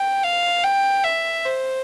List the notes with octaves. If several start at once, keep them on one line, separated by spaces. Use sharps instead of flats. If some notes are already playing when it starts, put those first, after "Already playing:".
Already playing: G5
F5
G5
E5
C5